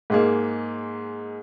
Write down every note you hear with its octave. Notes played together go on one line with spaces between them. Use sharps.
G#2 G#3 A#3